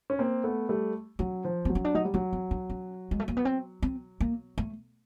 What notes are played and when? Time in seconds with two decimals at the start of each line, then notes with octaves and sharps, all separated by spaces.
0.10 C#4
0.19 A#3 C4
0.44 A3 B3
0.69 G3 A3
1.19 F#3 C#4
1.45 F3
1.65 F#3 C4
1.75 C#4
1.85 D4
1.94 F#3 D#4
2.05 G3
2.14 F#3 D4
2.33 C4
2.51 D4
2.70 C#4
3.11 G#3
3.20 A3
3.28 A#3
3.37 B3
3.45 C4
3.82 C4
4.20 A#3
4.58 A3